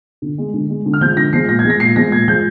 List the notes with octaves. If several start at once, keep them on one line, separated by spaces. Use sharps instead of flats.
D3
G#3
D3
G#3
D3
F6
F3 G#3 G6
D3 A#6
F3 G#3 C7
A#2 A#6
G#6
F3 G#3
A#6
A#2 C7
F3 G#3 A#6
A#2 G#6
F3 G#3 G6